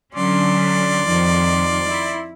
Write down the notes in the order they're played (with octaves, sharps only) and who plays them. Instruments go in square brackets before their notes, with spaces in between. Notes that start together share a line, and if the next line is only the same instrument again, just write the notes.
[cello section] D3 F#3 C#4 [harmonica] D5 C6
[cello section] F2 D#3 F3
E4